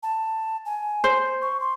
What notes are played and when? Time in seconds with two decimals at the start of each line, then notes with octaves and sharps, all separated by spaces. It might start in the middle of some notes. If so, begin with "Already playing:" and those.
0.03 A5
0.65 G#5
1.04 C5
1.42 C#6
1.61 C6